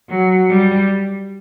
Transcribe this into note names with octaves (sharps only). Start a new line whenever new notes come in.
F#3
G3